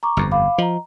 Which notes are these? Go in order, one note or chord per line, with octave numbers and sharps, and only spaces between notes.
A#5 C#6 D6
G1 F2
F5 B5 D6
F3 D#5 A#5